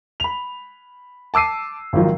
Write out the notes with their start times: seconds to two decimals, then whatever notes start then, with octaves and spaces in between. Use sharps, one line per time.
0.20 B5 F7
1.34 A5 D6 E6 C7 D#7
1.93 G#1 D#3 F3 F#3